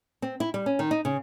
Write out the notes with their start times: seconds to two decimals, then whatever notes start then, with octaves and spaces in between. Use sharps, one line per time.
0.22 C4
0.40 E4
0.54 G3
0.66 C#4
0.79 D#3
0.91 D#4
1.05 C#3